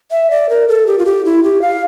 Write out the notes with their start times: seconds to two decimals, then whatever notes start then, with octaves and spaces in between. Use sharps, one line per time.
0.11 E5
0.31 D5
0.49 A#4
0.68 A4
0.87 G4
0.98 F4
1.06 G4
1.25 E4
1.44 G4
1.62 F5